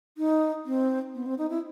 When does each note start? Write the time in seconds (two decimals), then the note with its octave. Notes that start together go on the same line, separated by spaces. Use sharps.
0.18 D#4
0.66 C4
1.14 B3
1.26 C4
1.38 D#4
1.50 E4